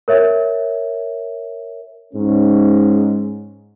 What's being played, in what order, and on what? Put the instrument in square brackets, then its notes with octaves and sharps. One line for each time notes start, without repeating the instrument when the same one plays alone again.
[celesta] A#4 C#5 E5
[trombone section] G#2 C#4